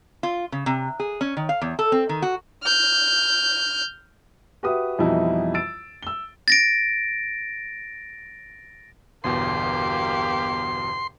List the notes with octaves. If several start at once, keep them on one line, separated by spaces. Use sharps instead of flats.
F4
C#3
C3
G#4
C#4
D#3
F5
E2
A4
C4
D#3
F#4
F6 G6
F#4 G4 B4 E5 D#6
F2 B2 E3 G3 D#4 E4
E6 A6 D7
E6 G7
A6 A#6 D7
G1 E2 B2 A#3 G4 C6